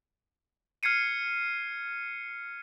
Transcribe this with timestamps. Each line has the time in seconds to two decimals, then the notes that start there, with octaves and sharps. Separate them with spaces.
0.83 F6 G#6 C7 C#7 D#7